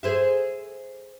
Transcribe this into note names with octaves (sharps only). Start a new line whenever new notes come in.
G#4 C5 E5